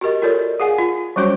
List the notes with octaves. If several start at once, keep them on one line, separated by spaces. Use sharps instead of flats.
F#4 G4 A#4 D#5
F4 A4 A#4 C#5 D5
G#4 F5 F#5 G#5
F4
F#3 G3 C#4 F#4 C5 C#5